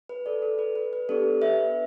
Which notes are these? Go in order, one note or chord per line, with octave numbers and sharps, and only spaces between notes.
B4
A4 D5
A4
B4
B4
B4
B3 D4 G4 A4 D5
B4 E5